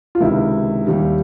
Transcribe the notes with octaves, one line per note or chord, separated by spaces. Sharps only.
F4
C#2 C3 D#3 E4
D#2 D#3 G3